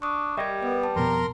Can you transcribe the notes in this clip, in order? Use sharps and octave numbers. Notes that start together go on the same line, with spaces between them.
D4 C#6 D#6
G3 G4 A#4 D#5 E5 G#6
B3 B4
A5
F2 B2 A#4 A#5 C6